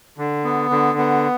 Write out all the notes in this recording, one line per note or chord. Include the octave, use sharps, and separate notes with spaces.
D3
B3
D3
B3